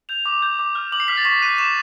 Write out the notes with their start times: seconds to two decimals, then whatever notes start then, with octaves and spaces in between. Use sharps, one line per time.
0.09 G6 F7
0.26 D6
0.42 G6
0.59 D6
0.75 F6
0.92 D6 F#7
1.00 C7
1.08 F6 B6
1.17 A6
1.25 C#6 B6
1.42 F#6 D#7
1.58 C#6 E7